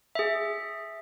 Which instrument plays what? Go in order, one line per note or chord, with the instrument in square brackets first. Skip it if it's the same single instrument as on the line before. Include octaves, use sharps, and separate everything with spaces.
[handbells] G#4 E5